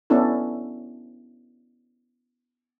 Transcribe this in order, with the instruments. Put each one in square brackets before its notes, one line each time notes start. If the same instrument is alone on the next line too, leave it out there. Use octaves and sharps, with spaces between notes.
[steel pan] B3 C#4 D4 E4 A4